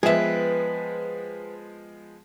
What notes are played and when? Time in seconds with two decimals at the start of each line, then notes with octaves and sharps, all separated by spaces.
0.03 F3 G#3 B3 G#4 B4 E5 G5